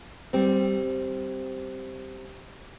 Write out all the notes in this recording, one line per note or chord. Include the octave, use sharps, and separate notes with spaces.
G3 C4